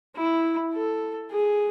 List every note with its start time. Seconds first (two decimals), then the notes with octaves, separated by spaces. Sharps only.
0.16 E4
0.74 A4
1.31 G#4